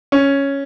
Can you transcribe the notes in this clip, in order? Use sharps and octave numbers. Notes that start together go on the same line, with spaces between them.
C#4